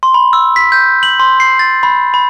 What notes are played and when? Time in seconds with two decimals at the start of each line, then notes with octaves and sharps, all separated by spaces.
0.03 C6
0.14 B5
0.33 E6
0.56 B6
0.72 G6
1.03 F#7
1.19 C6
1.40 C7
1.59 A6
1.83 B5
2.14 B5